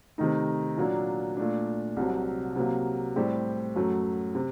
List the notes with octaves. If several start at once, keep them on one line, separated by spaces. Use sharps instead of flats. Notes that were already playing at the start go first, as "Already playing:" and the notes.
C3 D#3 A3 D#4
A#2 F#3 A#3 D4
A#2 A3 D4
C2 C3 F#3
C3 F#3 A#3
A2 G3 C4 G4
F#2 F#3 A3
C3